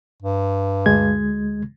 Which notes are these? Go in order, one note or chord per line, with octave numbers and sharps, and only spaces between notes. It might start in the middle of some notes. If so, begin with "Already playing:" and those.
G2
D2 G#3 G#6